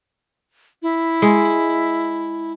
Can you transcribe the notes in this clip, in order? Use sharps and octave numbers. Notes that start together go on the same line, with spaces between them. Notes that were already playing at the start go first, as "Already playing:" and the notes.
E4
G#3